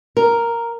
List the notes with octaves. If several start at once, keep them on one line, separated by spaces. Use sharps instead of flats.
A#4